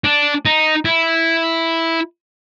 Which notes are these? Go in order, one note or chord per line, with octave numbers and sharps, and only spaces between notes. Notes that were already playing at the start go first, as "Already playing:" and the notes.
D4
D#4
E4